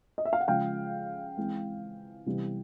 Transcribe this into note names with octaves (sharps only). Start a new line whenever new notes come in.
D#5
E5
F5
F#5
C#3 F3 G#3 F5 G5
E3 G#3 C4
C3 E3 G3 B3